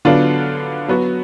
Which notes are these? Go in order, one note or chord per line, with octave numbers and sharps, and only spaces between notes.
D3 F#3 B3 D4 F4
F#3 B3 F#4